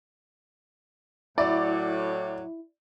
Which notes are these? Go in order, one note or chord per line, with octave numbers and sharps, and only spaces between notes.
A2 F#3 E4 D5